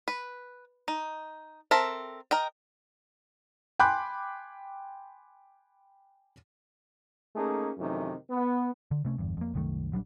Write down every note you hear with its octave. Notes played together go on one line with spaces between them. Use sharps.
B4
D#4
C4 A4 A#4 E5
A#4 D#5 G5
G5 G#5 B5 C6 D6 F#6
A3 A#3 C#4 D#4 G#4
F#2 C3 D#3 E3 A3 D#4
B3
D3
C3 A3 C#4
G1 E2 G2
F2 A#3
C2 F#2 D#3 A3
A#1 F#3 G3 D4